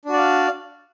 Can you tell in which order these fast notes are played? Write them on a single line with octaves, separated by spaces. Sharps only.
D4 F#4 D5 F5